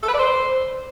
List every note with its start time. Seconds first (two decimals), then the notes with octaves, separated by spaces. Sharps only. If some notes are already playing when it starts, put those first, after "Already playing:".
0.03 A4
0.08 B4
0.13 D5
0.19 C5